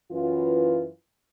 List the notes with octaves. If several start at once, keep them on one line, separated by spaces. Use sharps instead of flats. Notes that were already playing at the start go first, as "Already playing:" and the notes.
F#2 E3 F4